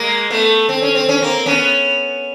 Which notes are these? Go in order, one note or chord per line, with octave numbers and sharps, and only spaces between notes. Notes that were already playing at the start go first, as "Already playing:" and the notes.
Already playing: G#3 A#3
A3 B3
C4
C#4
C4
C#4
A#3 C4
B3 C#4